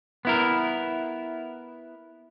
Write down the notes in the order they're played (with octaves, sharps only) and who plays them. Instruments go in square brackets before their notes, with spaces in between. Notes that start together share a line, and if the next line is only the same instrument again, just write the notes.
[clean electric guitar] B3 E4 A#4